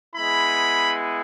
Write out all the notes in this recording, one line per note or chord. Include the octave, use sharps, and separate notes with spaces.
G#3 B3 E4 B5